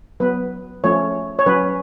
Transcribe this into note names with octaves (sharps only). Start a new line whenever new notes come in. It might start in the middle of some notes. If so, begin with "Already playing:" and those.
F#3 B3 B4
F3 A3 C#4 C#5
C#5
F#3 C#4 B4